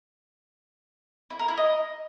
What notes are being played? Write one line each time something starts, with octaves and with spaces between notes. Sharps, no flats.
E4
A#4
E4
D#5